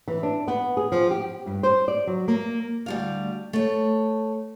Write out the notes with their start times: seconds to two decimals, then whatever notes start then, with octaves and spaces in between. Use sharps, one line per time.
0.08 E3
0.23 D4
0.48 B3
0.77 G#4
0.92 F3
1.11 G4
1.46 G2
1.63 C5
1.88 D5
2.07 F#3
2.28 A#3
2.86 D2 G3 F5
3.53 A3 C#5